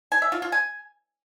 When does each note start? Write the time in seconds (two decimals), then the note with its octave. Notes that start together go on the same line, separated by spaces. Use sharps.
0.12 G#5
0.22 E5
0.32 F4
0.42 F4
0.52 G#5